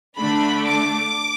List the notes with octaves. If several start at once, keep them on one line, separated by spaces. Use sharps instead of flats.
D3 A3 D4 B5
D6